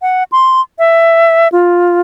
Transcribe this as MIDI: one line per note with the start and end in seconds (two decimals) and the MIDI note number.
0.02 0.24 78
0.32 0.61 84
0.79 1.48 76
1.52 2.01 65